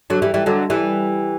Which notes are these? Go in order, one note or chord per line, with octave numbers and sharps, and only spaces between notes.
D3 F#3
E3 G3
E3 G3
D3 F#3
E3 G3